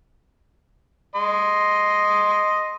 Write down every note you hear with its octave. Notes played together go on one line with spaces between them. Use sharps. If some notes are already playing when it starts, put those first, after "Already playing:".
D#5 C6